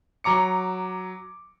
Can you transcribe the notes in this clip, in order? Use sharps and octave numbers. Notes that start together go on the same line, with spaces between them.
F#3 A#5 D6 C#7